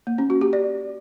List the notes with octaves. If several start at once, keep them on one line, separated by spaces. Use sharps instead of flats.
A#3
C#4
F#4
G4
D5